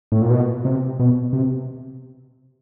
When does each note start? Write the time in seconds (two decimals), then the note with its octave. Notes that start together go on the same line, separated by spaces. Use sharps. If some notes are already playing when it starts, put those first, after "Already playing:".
0.12 A2
0.22 A#2
0.30 B2
0.65 C3
0.99 B2
1.33 C3